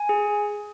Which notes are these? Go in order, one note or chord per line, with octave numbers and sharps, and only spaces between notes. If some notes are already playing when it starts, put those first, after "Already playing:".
Already playing: G#5
G#4